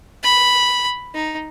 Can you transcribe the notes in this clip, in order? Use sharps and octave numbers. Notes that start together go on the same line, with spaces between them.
B5
D#4